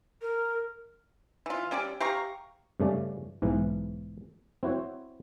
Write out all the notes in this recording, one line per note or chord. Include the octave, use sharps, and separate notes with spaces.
A#4
E3 F4
G3 C#4 G4 D5
G4 F5 A#5 C#6
G2 C#3 A3 C#4 D5
B1 G#2 E3
C4 E4 F#4 C5 C#5